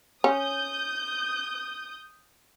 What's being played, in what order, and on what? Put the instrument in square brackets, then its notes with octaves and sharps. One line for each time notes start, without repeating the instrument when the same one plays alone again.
[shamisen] C#4 [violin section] D#6 G6